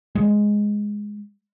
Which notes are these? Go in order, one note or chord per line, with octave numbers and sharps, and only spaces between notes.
G#3